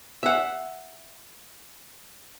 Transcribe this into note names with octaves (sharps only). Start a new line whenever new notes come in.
E5 F#5